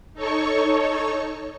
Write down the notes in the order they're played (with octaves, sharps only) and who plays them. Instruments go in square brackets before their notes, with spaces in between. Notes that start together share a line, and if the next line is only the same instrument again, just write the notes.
[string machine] D#4 A4 C#5 C#6